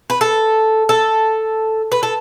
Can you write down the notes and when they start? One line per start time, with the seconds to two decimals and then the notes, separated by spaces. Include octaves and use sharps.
0.10 B4
0.21 A4
0.89 A4
1.92 B4
2.03 A4